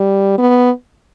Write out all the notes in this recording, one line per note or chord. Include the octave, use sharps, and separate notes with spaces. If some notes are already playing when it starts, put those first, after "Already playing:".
Already playing: G3
B3